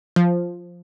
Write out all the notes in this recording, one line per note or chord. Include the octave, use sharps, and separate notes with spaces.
F3